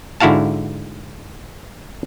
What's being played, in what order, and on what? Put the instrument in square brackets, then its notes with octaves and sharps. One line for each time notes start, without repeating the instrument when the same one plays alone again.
[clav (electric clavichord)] G#2 D3 E4 F#4 F5 A5